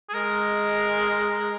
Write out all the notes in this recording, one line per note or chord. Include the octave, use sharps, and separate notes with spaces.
G#4
G#3 A#4